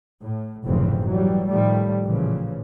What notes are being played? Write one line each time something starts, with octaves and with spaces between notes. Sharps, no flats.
A2
F1 A#1 G#2 C#3 E3 C4
E3 F#3 G3
A2 D#3 F3 G3 A3
A1 A#2 C#3 E3 F3